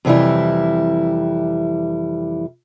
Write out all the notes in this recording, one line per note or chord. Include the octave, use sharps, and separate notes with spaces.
F2 C3 E3 G3 E4